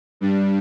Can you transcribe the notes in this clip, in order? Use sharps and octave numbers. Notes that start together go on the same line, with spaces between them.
G2 G3 D4